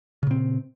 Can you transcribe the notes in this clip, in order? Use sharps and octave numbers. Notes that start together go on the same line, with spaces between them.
A#2 C#3 C4